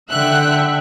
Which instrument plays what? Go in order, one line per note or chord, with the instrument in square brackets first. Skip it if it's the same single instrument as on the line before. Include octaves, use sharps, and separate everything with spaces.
[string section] D3 [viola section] E5 F#5 G5 [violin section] F#6